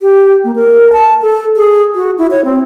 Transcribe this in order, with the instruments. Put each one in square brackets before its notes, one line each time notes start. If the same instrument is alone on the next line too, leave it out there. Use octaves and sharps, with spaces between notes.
[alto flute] G4
A#3
A#4
A5
A4
G#4
F#4
E4
C#5
C4